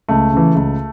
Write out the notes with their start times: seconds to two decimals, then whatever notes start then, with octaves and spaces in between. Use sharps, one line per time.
0.09 C#2 A3
0.32 C#3 E3
0.55 C#2